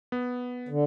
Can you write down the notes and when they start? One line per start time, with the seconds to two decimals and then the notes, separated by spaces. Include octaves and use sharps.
0.12 B3
0.69 D3